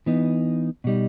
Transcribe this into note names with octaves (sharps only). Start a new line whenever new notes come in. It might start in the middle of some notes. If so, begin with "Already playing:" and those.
E3 B3 D#4
B2 G3 D#4